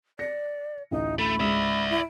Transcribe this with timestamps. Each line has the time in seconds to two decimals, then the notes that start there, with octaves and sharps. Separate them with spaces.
0.19 D5 A#6 C#7
0.91 A1 D2 D#4
1.19 A3 B5
1.40 C#2 G#2 D5 E5
1.90 E4